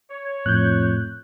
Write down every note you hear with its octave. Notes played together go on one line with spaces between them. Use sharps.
C#5
F2 A2 F#6 G6